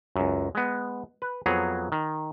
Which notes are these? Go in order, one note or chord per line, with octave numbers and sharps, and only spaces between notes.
C#2 F#2
G#3 B3
B4
F2 F#3 B3 G#4 A#5
D#3